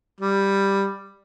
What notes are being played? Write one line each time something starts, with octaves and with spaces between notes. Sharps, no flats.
G3